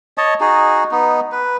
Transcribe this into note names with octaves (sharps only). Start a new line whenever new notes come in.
C#5 D#5 A5
D#4 F#4 G#4
B3 D#4
B4